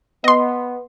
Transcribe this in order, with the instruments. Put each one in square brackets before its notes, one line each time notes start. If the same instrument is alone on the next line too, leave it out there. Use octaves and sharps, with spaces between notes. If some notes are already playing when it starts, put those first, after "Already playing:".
[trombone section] B3 [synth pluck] D#5 C6